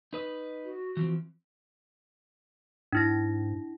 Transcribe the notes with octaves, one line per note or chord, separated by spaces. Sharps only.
D#4 B4 D#5
F#4
E3 F3 C4
G#2 D4 E4 A#6